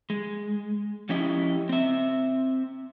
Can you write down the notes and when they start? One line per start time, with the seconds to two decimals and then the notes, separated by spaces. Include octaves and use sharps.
0.10 G#3
1.09 F3 C#4 E4 G4 D#5
1.69 C4 E5